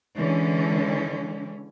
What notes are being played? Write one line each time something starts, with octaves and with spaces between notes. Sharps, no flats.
D3 E3 G#3 C#4